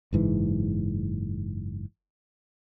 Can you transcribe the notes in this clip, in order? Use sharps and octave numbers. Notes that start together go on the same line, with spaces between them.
F#1 G#2 E3